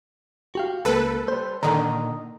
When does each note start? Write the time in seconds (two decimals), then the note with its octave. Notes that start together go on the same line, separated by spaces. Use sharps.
0.55 F#4 G4 F5
0.85 C#2 A#3 A4 B4
1.28 G3 C5
1.63 A#2 D3 D#3 D#5 A#5